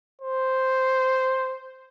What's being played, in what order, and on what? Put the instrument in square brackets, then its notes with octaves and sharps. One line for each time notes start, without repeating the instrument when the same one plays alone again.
[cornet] C5